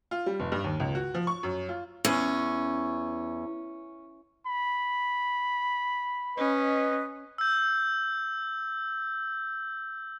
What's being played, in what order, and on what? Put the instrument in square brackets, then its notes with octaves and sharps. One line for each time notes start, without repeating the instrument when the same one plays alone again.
[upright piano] F4
G3
F1
G2
D#2
C#2
F#4
F3
C#6
F#2
F4
[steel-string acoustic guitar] E2 [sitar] C#4
[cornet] B5
[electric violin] C#4 [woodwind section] B4 D#5
[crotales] E6 G6